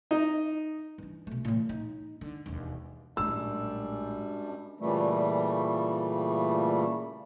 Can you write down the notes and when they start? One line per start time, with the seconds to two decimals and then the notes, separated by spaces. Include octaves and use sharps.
0.11 D#4
0.98 E3 D4
1.27 B2 A3
1.45 A2 E3
1.69 D#4
2.21 D3
2.46 E1 D#2
3.17 A#1 F#2 A2 G3 G#3 C#4 D4 E6
4.80 A#2 C#3 E3 G3 A3